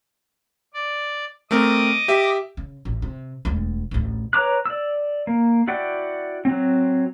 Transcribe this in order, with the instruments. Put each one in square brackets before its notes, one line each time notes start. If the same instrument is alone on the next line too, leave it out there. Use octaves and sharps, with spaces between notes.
[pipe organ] D5
[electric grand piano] A3 C4 A#4 [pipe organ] D#5 D6 D#6
[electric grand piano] G4 E5
[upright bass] C#3
A1
C3
E1 D2
A1 D2
[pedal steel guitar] B4 C#5 A#5 D6 F#6
D5 E6
A#3
E4 F#4 D5 F#5 G5
F#3 C4